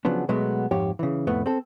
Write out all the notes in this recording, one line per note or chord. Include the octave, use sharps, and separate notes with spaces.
C#3 F3 F#3 B3 D4
B2 F#3 G#3 A3 B3
F2 G#2 F3 G4 C#5
C#3 E3
C2 F2 A2 A3 B3
C4 A4